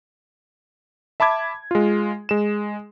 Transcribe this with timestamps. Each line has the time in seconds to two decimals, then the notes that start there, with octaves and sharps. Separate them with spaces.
1.20 E5 A5 B5 D6 G#6
1.71 G#3 F4
2.29 G#3 E7